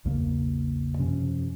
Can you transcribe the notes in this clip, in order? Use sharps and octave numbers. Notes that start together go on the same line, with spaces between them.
A#1 E2 C#3 A#3
F#2 C3 F3 C#4